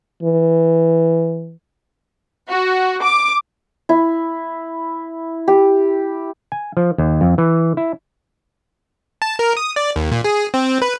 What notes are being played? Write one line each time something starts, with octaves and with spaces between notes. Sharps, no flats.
E3
F#4
D6
E4
G4
G#5
F3
D#2
F2
E3
E4
A5
A#4
D#6
D5
D#2
A#2
G#4
C4
B4